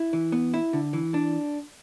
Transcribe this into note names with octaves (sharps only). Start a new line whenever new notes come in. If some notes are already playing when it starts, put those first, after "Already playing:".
Already playing: E4
E3
B3
E4
D3
E3
D4